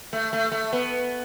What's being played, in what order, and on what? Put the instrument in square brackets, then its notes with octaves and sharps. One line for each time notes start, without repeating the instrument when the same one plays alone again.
[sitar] A3
A3
A3
B3